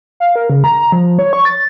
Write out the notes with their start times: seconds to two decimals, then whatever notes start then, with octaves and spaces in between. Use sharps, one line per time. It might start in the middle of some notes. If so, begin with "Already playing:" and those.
0.20 F5
0.36 A#4
0.50 C#3
0.64 A#5
0.92 F3
1.19 C#5
1.33 C#6
1.45 A6